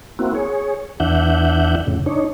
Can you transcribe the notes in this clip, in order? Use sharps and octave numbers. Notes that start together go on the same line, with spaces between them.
A#3 C4 E4 F#4
G#4 C#5
E2 E3 D4 E5 F#5 G6
F2 A2 C#3
D4 D#4 C#5